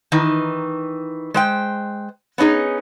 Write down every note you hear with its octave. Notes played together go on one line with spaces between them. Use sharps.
D#3 E3 D#4
G#3 C5 G5
B3 C#4 D#4 G#4